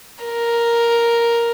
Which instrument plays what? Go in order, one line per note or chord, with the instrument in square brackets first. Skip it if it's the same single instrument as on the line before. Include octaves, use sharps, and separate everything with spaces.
[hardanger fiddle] A#4